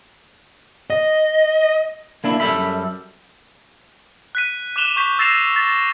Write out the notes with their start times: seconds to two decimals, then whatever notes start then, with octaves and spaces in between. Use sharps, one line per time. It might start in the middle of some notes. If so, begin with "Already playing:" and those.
0.90 D#5
2.24 A#3 D4 E4
2.40 F#2 G3 A4 E5 B5
4.35 F#6 B6 D#7
4.76 D6 F#6 E7 F7 G7
4.96 C#6 G6 B6
5.19 E6 A6 A#6 C7 E7 F7
5.56 A6